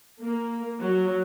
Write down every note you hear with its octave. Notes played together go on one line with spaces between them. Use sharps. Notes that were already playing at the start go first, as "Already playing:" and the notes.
A#3
F#3